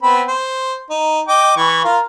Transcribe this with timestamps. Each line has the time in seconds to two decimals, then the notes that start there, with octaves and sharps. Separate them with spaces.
0.03 B3 C4 B5
0.28 C5
0.90 D#4
1.28 D#5 G5 D6
1.56 E3 C#6
1.84 F4 A#4 F5